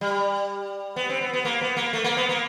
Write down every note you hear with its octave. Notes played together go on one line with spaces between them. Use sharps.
G3
B3
C4
B3
B3
A#3
B3
A#3
A3
A#3
B3
A#3